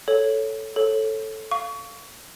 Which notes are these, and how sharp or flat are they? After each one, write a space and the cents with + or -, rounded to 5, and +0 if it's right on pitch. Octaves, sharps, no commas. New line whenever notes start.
A4 +0 C#5 +5
A4 +0 C#5 -20
F5 +0 C#6 +30